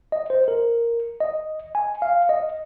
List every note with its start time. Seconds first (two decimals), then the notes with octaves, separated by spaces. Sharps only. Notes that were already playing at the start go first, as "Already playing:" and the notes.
0.12 D#5
0.30 C5
0.48 A#4
1.20 D#5
1.75 G#5
2.02 F5
2.29 D#5